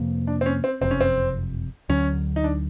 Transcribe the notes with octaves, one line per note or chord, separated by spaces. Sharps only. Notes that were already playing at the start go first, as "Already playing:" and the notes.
Already playing: F2 C3 F3 A#3
D4
C4
C#4
C4
F#1 F2 C3 C4
C#4
C4
D2 D3 F#3 C#4
D#4
D4